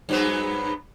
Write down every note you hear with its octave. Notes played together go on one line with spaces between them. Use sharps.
G2 F#3 B3